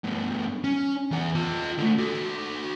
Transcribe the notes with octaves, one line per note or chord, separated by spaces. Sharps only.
G2 B2
C#4
E2 B3
F4 D#5
D3 A3
F#4 A4